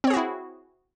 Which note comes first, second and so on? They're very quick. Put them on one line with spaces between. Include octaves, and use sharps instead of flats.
C4 C#5 G#4 F#4 E4